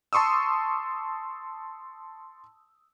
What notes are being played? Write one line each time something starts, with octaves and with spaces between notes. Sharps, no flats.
A5 C6 C#6 D#6 E6